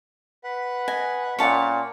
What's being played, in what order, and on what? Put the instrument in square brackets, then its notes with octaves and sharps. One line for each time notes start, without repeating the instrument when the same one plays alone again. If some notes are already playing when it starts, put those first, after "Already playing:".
[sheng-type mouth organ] B4 F#5
[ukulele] D#5 [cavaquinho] G#5
[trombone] A#2 [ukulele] C#4 F#5 [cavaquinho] C#5 A5